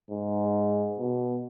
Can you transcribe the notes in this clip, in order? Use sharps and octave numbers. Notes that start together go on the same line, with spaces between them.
G#2
B2